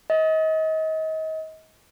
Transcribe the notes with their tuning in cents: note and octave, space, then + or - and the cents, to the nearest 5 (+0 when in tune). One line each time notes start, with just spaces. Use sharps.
D#5 +30